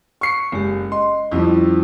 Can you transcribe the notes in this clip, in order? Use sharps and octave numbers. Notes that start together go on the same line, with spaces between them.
C#6 C7 C#7
F#1 G#3 G4
D#5 C6
F2 F3 G3 C#4 E4